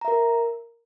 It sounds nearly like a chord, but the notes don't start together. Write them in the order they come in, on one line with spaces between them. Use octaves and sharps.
A#5 E5 A#4